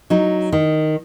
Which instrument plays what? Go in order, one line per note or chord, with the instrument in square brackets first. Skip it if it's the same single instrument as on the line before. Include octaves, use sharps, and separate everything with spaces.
[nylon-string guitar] F#3 D#4
D#3